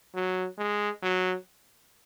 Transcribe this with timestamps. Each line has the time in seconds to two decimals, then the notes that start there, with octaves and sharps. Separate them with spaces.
0.15 F#3
0.59 G#3
1.03 F#3